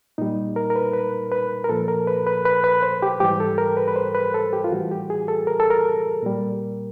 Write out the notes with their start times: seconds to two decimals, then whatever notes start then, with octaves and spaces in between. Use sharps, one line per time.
0.18 A#2 G3 D#4
0.56 A#4
0.70 A#4
0.76 B4
0.93 B4
1.32 B4
1.64 A#4
1.69 A#2 F3 A4
1.88 A#4
2.07 B4
2.27 B4
2.45 B4
2.64 B4
2.83 C5
3.02 G4
3.20 G#2 E3 G3 G4
3.40 A4
3.58 A#4
3.77 B4
3.88 B4
3.96 C5
4.15 B4
4.34 A4
4.53 G4
4.64 F4
4.72 A2 E3 G3 F#4
4.91 G4
5.10 G#4
5.28 A4
5.47 A#4
5.60 A4
5.70 A#4
6.23 A#2 G3